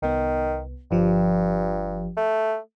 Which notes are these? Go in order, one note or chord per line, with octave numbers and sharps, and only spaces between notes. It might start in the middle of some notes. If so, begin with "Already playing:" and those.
C2 D#3 B3
G1 G2 F3 G4
A3